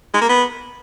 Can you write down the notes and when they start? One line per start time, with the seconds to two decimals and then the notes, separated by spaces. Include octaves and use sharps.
0.14 G#3
0.21 A#3
0.29 B3